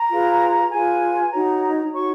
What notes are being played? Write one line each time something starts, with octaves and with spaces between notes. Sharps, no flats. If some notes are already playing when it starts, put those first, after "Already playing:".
Already playing: A#5
F4 G#4 B4
F4 G#4 B4 G#5
D#4 F#4 C#5 A#5
D#4 F#4 C#5 C#6